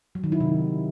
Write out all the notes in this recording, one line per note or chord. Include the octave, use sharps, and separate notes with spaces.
F#3
D#3
E4
C3